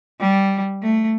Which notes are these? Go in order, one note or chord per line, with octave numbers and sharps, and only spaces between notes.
G3
A3